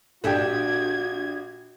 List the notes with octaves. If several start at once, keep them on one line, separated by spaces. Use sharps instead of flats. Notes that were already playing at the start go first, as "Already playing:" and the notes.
A#1 D4 F#4 G4 A4 G5 G#6